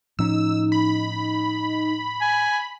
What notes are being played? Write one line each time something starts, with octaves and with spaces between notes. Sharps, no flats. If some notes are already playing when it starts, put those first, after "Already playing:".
A2 F3 C#4 D#4 E6
B5
G#5